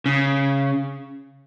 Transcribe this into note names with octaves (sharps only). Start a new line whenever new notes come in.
C#3